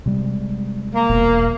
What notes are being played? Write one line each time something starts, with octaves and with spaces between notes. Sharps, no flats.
C3 G3 G#3
A#3
E1 B1 B2